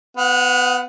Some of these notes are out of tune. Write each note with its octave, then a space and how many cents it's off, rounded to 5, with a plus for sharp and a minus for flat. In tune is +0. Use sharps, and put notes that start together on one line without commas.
B3 +25 F#5 -30